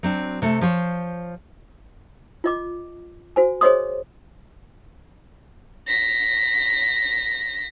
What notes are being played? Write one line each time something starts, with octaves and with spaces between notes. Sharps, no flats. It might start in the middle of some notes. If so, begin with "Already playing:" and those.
F#3 C4 D4
C3 A3
F3 C5 C#5
F4 D#5 D6
F#4 C5 G#5
G#4 C5 C#5 D#5 C6 D#6
A#6 B6